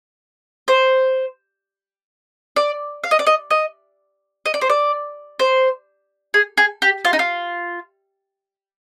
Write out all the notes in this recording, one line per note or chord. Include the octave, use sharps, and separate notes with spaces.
C5
D5
F5
D#5
D5
D#5
D#5
D#5
D5
C5
D5
C5
G#4
G#4
G4
F4
D#4
F4